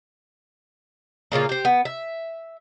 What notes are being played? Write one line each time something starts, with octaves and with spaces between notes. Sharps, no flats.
A#2 C#3 A#3 F4
G4 C5
B3
E5